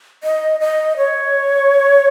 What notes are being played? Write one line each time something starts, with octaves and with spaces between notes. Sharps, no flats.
D#5
D#5
C#5